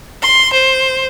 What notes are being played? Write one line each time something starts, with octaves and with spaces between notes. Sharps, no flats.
C6
C5